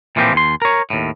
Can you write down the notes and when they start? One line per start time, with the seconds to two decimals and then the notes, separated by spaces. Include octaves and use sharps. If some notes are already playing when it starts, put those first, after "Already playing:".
0.16 A#2 E3 F3 A#3 C4 G4
0.33 D#2 C6
0.62 A#4 C#5
0.90 D#2 A2